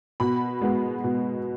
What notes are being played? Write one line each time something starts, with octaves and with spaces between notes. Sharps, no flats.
B2 B5
G#3 B3
B2